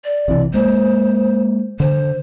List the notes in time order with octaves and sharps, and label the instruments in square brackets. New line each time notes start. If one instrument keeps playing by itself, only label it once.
[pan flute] D5
[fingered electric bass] B1 C3 E3
[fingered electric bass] G#3 A#3 [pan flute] C5
[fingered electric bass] D3 [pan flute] C5